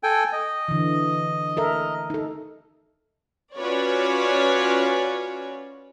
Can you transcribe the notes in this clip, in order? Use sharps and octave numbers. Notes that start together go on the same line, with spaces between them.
A4 G5 G#5
D#5
D3 E3
A4 A#4 E5
D#4 A4
C#4 F4 F#4 B4 C#5 D5